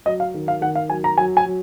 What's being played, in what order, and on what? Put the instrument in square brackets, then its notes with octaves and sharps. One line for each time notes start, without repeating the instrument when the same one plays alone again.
[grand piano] F#3 D#5
F5
D#3
F5
D#3 F#5
F5
F#3 G#5
A#5
F#3 G#5
G#5
F#3